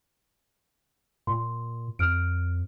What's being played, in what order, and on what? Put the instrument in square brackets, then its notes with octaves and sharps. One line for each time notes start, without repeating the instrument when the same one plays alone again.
[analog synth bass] A#2 [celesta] C6
[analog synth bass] F2 [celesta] F6 D7